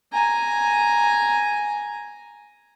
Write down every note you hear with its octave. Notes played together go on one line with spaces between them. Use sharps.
G#5 A#5